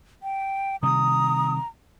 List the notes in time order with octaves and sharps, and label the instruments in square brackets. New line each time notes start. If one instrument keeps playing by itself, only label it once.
[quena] G5
[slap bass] C3 D#3 G3 [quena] A#5 [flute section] D#6